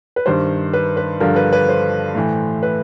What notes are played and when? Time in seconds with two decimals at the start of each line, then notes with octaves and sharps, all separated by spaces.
0.16 B4
0.26 G2 D#3 C5
0.73 B4
0.97 B4
1.20 G2 D3 F3 A#4
1.36 B4
1.53 B4
1.69 C5
2.15 A2 E3
2.63 B4